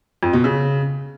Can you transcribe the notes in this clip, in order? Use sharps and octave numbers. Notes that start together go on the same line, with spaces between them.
F2
B2
C#3